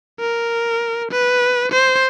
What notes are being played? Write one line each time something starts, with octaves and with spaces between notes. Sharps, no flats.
A#4
B4
C5